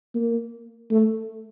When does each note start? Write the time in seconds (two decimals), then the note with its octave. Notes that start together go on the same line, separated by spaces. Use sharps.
0.15 A#3
0.91 A3